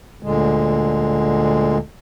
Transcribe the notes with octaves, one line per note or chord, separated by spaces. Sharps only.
D2 A#2 D3 G#3